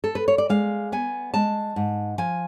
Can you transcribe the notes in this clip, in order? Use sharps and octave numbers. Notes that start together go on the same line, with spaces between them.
A4
B4
C#5
D5
G#3 F5
B3 G#5
G#3 A5
G#2
F3 G#5